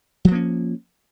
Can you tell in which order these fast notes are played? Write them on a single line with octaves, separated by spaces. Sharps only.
F#3 F3 A#3 C#4